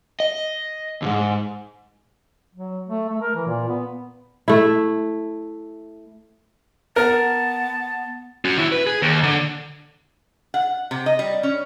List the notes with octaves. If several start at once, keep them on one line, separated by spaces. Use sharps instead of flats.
D#5
D#2 G#2
F#3
A3
A3
A#4
E3
A#2
B3
A3 E4
B3 A#4 A5
C#4 F#4
D#2 E4
B4
G#4
D#2
D3
F#5
C3
D#5
G3
C#4